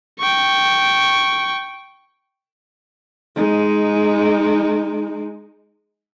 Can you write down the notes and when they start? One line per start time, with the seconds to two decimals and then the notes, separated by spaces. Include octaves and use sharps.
0.20 G5 C#6
3.36 G#3 D#4